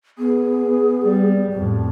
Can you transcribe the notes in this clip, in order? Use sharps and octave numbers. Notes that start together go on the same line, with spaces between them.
B3 G#4
G3
F2 A2